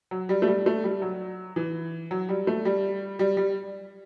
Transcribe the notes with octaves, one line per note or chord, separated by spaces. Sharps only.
F#3
G3
A3
G3
A3
G3
F#3
E3
F#3
G3
A3
G3
G3
G3